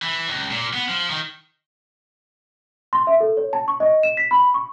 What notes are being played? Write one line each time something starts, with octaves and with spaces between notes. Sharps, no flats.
E3
C#2
A#2
B3
F3
D#3
C6
E5
A4
C#5
A5
C#6
D#5
E7
B6
B5
C#6